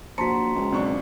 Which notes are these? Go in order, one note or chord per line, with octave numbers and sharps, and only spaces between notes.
A#1 F#4 C5 A5 A#5 C6 B6 C#7
C#2
B1 C4 D4 C#6